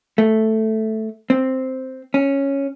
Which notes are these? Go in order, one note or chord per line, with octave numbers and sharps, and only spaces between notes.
A3
C4
C#4